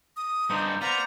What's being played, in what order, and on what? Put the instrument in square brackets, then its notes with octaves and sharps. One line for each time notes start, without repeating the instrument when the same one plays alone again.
[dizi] D#6
[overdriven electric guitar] G2 D3 [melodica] D#4 C5
[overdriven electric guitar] B3 [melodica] C5 D5 F5 [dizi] A#5